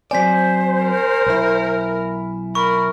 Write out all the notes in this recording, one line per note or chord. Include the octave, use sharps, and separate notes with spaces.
F#3 C4 C5 D5 G#5 B6
A#4
B1 E4
A#4 B5 C#6